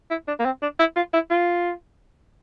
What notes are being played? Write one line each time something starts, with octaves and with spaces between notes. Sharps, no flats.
E4
D4
A#3
C4
D4
E4
F4
E4
F4